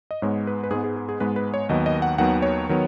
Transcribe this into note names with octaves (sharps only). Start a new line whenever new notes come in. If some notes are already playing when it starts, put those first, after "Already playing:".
D#5
G#2 G#3 B3 C#5
B4
B4
G#2 G#3 B3 G#4
G#4
G#4
G#4
G#2 G#3 B3 B4
B4
C#5
D#2 D#3 F#3 B3 D#5
D#5
F#5
D#2 D#3 F#3 B3 F#5
C#5
D#3 F#3 B3